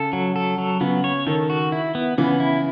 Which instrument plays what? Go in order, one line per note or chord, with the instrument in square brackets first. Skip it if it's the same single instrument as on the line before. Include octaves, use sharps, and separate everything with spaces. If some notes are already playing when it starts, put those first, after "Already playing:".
Already playing: [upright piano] C#3 [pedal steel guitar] A4
[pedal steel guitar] F#3
A4
F#3
[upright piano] C#3 [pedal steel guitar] B3
[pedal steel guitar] C#5
[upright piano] D#3 [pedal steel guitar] A4
[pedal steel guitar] F#4
E4
B3
[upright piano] C#3 E3 [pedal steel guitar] B3
[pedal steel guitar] E4